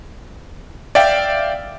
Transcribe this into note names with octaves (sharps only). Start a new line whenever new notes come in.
D5 E5 F5 G5